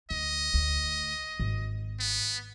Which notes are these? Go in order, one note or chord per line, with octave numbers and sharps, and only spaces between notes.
D2 D#5
D2
G#1
B3